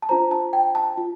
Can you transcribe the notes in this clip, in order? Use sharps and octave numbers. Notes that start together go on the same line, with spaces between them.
A5
D4 F4 C5 A#5
A5
G5
A5
F4